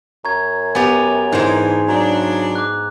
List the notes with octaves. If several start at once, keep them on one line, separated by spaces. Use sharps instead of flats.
F#2 A#5 C#6 G#6
B3 G4 G#5 A6 F7
G#2 E3 G#3 D4
C#3 F#3 D4 A#5
D6 F#6